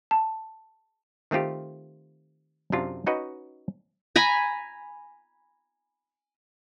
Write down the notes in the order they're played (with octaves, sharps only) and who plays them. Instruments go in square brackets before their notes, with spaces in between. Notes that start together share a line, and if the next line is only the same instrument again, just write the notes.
[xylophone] A5
[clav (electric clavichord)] D#3 A3 C4 F4 G4
F#2 C3 D4 F4
C#4 D#4 F#4 B4 D#5
[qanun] G#5 A#5 B5